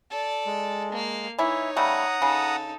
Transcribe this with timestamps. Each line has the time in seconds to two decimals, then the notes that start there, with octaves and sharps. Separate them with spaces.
0.10 A4 D5
0.46 G#3
0.92 A#3 F5
1.39 E3 D#4 E4 C#5
1.77 C#3 G3 A3 F#5 A#5 D#6
2.22 C#3 D#4 A4